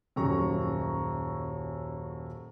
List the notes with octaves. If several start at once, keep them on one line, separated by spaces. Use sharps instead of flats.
D#1 F#2 A#5 C#6